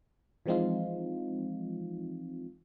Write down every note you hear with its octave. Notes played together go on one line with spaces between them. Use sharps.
E3 F3 G#3 C4 D#4 F4